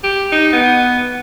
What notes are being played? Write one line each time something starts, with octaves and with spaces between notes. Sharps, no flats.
G4
D#4
B3